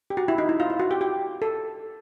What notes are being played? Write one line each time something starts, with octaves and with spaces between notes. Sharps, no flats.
G4
F#4
E4
D#4
E4
F4
F4
F#4
G4
G4
A4